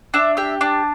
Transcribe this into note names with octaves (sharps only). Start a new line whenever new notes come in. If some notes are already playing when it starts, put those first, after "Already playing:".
D4 E5
G4 E5
D4 A5